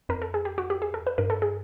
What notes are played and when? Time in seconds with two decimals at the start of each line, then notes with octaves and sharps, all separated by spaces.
0.09 F2 A#4
0.22 A4
0.34 G#4
0.45 G4
0.58 F#4
0.70 G4
0.82 E2 G#4
0.91 F2 A4
1.00 E2
1.07 F2 B4
1.18 G2 A#4
1.30 A4
1.42 G#4